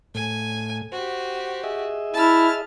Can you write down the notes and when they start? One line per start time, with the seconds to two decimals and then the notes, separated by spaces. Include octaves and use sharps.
0.15 A2 G#5
0.92 F#4 G4 C5
1.64 G#4 D#5 E5
2.14 E4 A5 F6